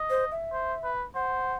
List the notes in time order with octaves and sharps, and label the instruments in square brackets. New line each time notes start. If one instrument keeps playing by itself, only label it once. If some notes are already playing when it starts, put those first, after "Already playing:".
Already playing: [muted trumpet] D#5
[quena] C5
E5
[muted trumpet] C5
B4
[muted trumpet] C5 [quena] F#5